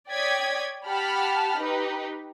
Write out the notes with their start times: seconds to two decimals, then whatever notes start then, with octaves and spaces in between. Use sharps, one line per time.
0.10 C#5 D5 G5 D#6 G#6 B6
0.85 G4 F#5 A5 B5 F6
1.57 D#4 G4 B4